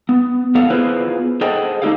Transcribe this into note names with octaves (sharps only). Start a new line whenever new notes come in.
B3
A2 B3 A4 F5 F#5
B3 E4 F4 G#4 B4 C5
G#4 A4 C5 D#5 F#5 G5
A3 D4 D#4 G4 A4 F5